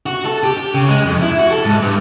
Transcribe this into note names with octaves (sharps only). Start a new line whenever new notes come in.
F#4
A4
G4
G4
C#3
G#3
F2
E4
F#4
A4
G#2
G2